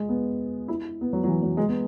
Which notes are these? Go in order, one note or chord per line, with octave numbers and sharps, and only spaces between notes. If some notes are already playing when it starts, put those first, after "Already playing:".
Already playing: G#3
B3
E4
B3
F#3
F#3
E3
F#3
G#3
B3